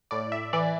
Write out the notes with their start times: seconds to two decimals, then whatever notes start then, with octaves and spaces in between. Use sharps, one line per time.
0.11 A2 D5
0.32 E5
0.53 E3 D5